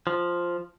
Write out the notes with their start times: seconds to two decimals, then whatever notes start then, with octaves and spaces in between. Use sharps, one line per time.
0.07 F3